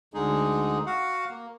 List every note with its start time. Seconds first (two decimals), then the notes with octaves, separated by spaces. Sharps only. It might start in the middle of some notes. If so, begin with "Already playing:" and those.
0.14 D2 D3 G#3 D#4 G#4
0.86 F#4 F5 F#5
1.30 A#3